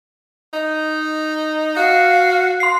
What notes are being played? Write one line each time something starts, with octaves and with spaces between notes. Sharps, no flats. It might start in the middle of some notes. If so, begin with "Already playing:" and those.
D#4
F#4 F5
C6 C7